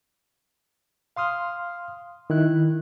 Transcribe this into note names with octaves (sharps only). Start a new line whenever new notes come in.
F5 C6 D#6 F6
D#3 E4 F#6